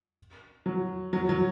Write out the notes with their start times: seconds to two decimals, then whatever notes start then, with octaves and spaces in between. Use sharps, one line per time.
0.66 F#3
1.13 F#3
1.29 F#3